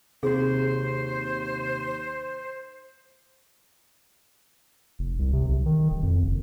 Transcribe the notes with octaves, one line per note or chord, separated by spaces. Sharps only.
D#2 C3 F#4 G#4 C5
F1
C2
C3
B1
D#3
D#1
F2
F#1